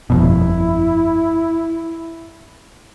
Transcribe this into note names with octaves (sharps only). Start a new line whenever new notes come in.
G1 F2 B2 E4